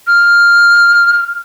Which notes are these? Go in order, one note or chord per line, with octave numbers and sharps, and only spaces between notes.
F6